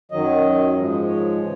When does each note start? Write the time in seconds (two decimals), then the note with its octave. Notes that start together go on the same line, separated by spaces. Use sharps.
0.11 F#2 D#3 F#3 D#5
0.75 G#2 F3 G#3 D#5
0.90 D#5
1.07 C#5
1.39 C#3 E3